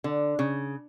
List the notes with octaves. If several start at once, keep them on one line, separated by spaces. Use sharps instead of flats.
D3
C#3